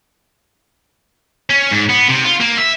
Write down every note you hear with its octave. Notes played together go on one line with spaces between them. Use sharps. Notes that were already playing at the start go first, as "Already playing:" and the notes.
C#4
G#2
B3
C3
F4
A#3
E5